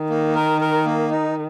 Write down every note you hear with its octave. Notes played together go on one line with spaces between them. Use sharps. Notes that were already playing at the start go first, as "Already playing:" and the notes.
Already playing: D#3
A#3
A#4
A#4
A#3
D#4